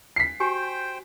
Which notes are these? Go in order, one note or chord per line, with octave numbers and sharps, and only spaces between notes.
B6 C7
F#4 G4 C5 G5 G#5